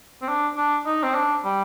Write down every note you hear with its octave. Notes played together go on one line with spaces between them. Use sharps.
C4
D4
D4
D#4
C4
D4
G3